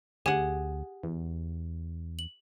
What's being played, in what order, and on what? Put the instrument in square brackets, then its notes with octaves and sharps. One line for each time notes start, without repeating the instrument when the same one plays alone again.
[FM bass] D2 [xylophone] G4 [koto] G#4 F#5
[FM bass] E2
[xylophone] F#7